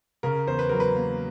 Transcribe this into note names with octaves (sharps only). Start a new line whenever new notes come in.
C#3 A#4
E2 C5
B4
F#3 A#4
B4
A#3